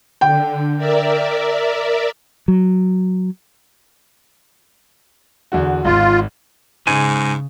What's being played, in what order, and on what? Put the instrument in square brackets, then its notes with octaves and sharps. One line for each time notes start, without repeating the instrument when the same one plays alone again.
[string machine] D3 [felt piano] G5
[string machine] A#4 D5 E5
[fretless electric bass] F#3
[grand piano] E2 D3 F#4
[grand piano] G#1 [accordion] F4
[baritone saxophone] G#2 [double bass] C#3 [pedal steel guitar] G#3 G#5